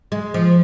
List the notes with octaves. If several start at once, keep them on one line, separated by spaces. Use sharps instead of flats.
G#3
F3